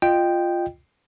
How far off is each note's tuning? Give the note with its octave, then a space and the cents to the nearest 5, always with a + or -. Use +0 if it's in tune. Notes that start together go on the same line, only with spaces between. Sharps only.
F4 +0 D#5 -20 G5 +0